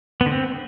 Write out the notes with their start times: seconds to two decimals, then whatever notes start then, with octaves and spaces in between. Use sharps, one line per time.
0.21 B3
0.26 D3
0.31 C4